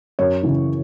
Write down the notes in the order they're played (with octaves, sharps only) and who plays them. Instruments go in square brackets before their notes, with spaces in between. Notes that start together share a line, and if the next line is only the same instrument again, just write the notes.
[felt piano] F#2 C#5
C#3 E3